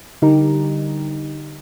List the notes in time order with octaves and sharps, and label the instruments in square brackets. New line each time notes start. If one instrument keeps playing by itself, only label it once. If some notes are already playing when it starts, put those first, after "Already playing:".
[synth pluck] D3 G3 D#4 G4 A#4